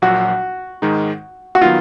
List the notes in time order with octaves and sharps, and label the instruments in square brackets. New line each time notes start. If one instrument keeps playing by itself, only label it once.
[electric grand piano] A#1 A#2 F#3 [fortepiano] F#4
[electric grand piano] G#2 D#3 G#3 D#4
[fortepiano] F#4
[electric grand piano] D#3 F#3 B3 [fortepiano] F4